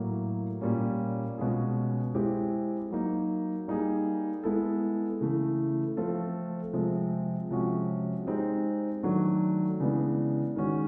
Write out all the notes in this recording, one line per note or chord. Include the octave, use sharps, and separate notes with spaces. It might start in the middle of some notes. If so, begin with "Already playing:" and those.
Already playing: A2 F#3 A#3
A#2 G3 A#3 C#4
B2 G#3 C#4 F4 G#4
G#3 C4 E4 G4
F#3 A#3 D#4
G3 A#3 D#4 G#4
G#3 B3 E4 A4
C#3 E3 A3
F3 A3 C4 F4 A4
C3 F3 G#3 C4
C3 F3 G#3 C#4 F#4
G#3 C4 D#4 G4
D#3 F#3 A3 D4 F#4
C#3 E3 G#3 B3 D4
D#3 G#3 C#4 F#4